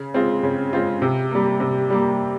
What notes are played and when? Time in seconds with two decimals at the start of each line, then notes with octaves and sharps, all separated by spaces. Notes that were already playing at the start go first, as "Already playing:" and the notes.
Already playing: C#3
0.14 G#3 C4 F4
0.43 C#3
0.73 G#3 C4 F4
1.02 C3
1.31 G3 A#3
1.60 C3
1.90 G3 A#3